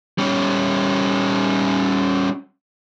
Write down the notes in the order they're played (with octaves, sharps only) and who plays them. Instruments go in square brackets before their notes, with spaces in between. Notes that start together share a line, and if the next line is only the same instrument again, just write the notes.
[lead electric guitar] G3 C#4